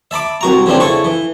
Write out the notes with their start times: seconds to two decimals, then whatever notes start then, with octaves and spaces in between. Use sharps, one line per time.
0.11 E5 A5 B5 D6
0.41 C2 F#4 A#5
0.66 C#3 E3 C4 D4
0.80 C#3 E4 A4 C#6
1.04 E3